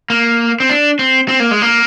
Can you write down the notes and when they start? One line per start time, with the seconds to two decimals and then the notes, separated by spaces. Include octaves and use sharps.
0.10 A#3
0.60 C4
0.70 D4
0.99 C4
1.28 C4
1.40 A#3
1.51 G#3
1.62 A#3